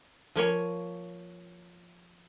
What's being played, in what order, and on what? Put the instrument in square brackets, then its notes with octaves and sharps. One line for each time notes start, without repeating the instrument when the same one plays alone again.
[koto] F3 A#3 C#5 G#5